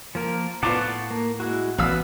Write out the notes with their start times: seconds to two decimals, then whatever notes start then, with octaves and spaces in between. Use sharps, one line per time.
0.15 F3 A#3 A#4
0.63 A2 B3 F4 F#5 A5 C#6 D6
1.11 A#3
1.40 G#3 E4 F#4
1.78 A1 E3 B3 F#4 B4 F5 E6